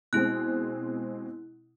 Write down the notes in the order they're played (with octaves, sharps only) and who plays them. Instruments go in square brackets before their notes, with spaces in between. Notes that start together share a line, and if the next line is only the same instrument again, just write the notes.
[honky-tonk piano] B2 G#3 C4 [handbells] E4 F#6